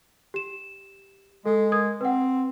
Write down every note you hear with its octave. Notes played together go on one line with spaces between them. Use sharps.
G4 E7
G#3 A4
A#4 D#6 G#6
C4 B4 F#5